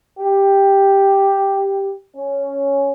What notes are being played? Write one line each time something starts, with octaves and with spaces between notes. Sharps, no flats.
G4
C#4